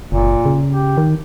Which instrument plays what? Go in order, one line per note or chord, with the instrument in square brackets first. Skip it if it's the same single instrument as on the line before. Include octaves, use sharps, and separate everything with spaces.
[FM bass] F#1 [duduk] A#2
[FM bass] C#3
[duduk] G4
[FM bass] D#3